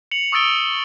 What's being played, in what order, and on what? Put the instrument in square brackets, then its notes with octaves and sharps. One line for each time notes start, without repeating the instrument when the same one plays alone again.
[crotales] C#7 F7 F#7
C#6 D#6 E6 A6 D7 G7